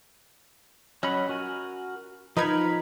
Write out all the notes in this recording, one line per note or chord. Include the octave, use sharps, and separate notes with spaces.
F#3 C#4 D#5 B5
F#4 A#4 G#5
F3 D#4 A#4 B4 B5 G#6